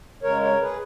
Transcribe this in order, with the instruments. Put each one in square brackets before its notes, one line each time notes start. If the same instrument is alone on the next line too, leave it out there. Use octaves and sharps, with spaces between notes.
[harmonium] C#3 G#3 A#4 C#5
A#4 C#5
G#4 B4